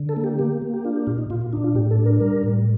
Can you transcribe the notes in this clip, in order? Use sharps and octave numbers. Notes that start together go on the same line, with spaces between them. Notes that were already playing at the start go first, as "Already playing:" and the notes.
Already playing: D3
A4
A#3
G4
A#3 G4
A#3
G4
D4 F4
G4
A#2 F4
D#4
A#2 F4
F4
D4 D#4
F4
A2 G4
A4
D4
A#4
G3 A#4
A2